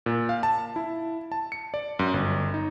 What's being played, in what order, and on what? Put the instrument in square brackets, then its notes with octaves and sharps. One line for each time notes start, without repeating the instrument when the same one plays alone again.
[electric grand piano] A#2
F5
A5
E4
A5
C#7
D5
F#2
G1
D#4